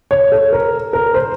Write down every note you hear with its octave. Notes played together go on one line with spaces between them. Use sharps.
C#5
A4
A#4
A#4
C5